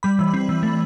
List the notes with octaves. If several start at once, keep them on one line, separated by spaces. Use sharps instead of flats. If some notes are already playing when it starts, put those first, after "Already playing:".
G3 B5
E3
C4
E3
A3